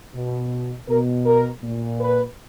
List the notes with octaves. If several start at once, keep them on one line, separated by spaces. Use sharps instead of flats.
B2
B2 A#4
A#4
A#2
B4